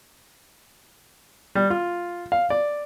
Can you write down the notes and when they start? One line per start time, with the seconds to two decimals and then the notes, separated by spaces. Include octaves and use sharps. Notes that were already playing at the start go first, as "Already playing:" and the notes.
1.55 G3
1.70 F4
2.32 F5
2.50 D5